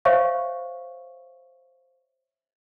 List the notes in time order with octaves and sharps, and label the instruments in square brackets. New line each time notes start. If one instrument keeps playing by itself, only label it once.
[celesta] C5 C#5 E5 F5 C#6